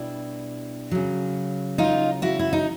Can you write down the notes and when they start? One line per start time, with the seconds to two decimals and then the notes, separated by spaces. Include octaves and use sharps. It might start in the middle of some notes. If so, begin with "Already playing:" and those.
Already playing: B2 G3 D4 E4
0.91 C#3 F#3
1.78 D#4 F4
2.22 E4 F#4
2.39 E4
2.53 D#4